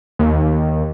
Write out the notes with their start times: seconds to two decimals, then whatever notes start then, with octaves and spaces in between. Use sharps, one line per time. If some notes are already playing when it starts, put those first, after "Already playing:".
0.19 D#2